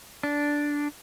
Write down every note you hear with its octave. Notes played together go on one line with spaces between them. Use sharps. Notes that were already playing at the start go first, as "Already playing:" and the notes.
D4